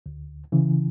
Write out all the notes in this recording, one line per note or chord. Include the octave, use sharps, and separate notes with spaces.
D2
C#3 E3